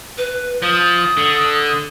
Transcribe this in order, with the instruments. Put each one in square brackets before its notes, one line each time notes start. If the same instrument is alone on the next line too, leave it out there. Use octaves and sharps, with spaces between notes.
[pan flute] B4
[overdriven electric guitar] F3 [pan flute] D#6
[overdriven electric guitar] D3